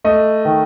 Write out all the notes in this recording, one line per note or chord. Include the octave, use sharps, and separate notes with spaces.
A3 D#5
D#3